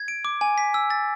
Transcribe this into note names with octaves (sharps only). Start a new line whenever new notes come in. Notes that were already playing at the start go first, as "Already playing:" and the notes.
Already playing: G#6
D7
D6
G#5
B6
E6
A6